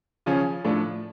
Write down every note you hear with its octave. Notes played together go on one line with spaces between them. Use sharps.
C#3 F3 C#4
A2 F3 A3 D4